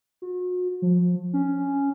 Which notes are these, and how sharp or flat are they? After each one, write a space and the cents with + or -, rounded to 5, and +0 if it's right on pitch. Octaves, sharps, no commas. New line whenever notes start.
F#4 -40
F3 +25
C#4 +5